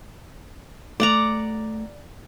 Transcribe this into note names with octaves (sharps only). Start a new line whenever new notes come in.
A3 D5 F#5 A#5